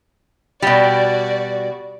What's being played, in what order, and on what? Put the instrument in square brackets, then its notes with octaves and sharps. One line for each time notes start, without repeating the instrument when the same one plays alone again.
[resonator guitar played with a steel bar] B2 G3 [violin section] F#4 D5